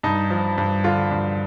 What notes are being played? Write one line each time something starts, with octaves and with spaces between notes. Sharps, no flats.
G2 D#4
F3
G2
D3 F4
G2